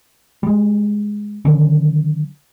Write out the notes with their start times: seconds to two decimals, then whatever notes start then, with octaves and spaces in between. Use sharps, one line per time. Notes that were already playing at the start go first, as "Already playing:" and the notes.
0.43 G3 G#3
1.45 D3 D#3 F#3 C#4